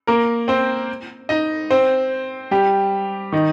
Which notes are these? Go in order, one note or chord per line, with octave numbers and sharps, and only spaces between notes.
A#3 A#4
C4 C5
D#4 D#5
C4 C5
G3 G4
D#3 D#4